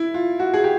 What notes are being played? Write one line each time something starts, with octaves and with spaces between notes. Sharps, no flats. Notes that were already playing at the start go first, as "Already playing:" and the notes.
Already playing: E4
F4
F#4
G#4
G4